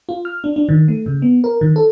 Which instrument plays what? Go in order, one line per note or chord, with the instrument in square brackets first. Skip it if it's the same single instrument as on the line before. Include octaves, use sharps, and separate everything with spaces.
[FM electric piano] F4
F6
D4
D4
D#3
A3
C#3
B3
A#4
D#3
A4